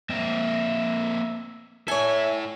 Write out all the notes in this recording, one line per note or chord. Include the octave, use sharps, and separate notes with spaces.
A#3 C4 D#5 E5
E4 A4 C#5 E5 G#5